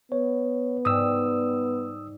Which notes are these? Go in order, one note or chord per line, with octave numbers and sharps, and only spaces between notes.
B3 C#5
G#2 G3 D#6 E6